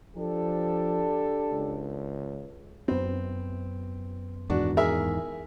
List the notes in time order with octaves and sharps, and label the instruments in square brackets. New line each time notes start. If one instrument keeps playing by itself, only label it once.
[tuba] F3 [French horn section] D4 G4 A4
[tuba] C#2
[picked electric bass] F#2 B3 [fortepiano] C4
[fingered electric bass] E2 G#2 D#3 [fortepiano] D4 F#4
[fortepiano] G#4 A#4 E5